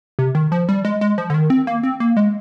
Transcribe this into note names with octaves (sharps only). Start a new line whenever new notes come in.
C3
D#3
F3
G3
G#3
G#3
F3
D3
D#3
C4
A#3
C4
A#3
G#3